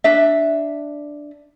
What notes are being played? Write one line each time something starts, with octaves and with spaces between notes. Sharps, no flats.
D4 E5